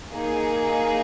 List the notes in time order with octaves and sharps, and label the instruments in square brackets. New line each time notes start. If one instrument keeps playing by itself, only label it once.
[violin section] A#3 D#4 G#4